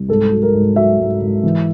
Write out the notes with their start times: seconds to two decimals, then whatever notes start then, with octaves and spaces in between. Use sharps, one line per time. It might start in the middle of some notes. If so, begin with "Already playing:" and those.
Already playing: C2
0.09 G#2 A4
0.32 F#3
0.43 A#4
0.54 G#2
0.76 F#3 E5
0.99 G#2
1.21 G#2
1.43 E3